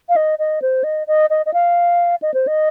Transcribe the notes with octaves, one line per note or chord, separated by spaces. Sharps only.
F5
D#5
D#5
C5
D#5
D#5
D#5
D#5
F5
D#5
C5
D#5